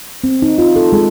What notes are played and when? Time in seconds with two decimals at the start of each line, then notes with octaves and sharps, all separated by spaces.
0.24 C4
0.42 D#4
0.58 F4
0.76 A4
0.93 G#3